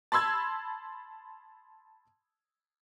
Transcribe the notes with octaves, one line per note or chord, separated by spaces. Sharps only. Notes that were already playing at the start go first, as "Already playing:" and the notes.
A5 B5 C6 E6 G#6